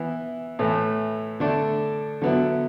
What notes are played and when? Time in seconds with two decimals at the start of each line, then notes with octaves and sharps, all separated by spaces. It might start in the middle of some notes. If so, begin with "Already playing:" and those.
Already playing: E3 B3 E4
0.59 A2 E3 A3
1.40 D3 A3 D4
2.22 D3 F#3 B3 E4